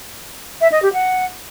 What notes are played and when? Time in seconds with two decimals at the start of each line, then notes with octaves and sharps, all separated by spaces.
0.61 E5
0.72 D#5
0.82 G4
0.93 F#5